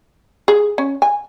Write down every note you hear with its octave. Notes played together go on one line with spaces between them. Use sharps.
G#4
C#4
G#5